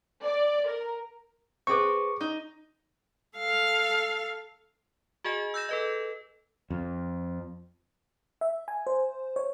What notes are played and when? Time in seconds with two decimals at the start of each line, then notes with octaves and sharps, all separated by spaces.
0.24 D5
0.68 A#4
1.67 C4 G#4 B4 C#6 D6
2.21 D#4
3.38 A4 F5
5.24 F#4 G#4 D#5 G#5
5.54 E6 G6 A#6 E7
5.69 A4 B4 D#5
6.70 F2
8.41 E5
8.68 G#5
8.87 C5
9.36 C#5